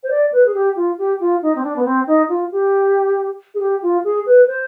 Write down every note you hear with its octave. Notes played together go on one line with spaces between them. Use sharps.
C5
D5
B4
G#4
G4
F4
G4
F4
D#4
C4
D4
B3
C4
D#4
F4
G4
G#4
G4
F4
G#4
B4
C5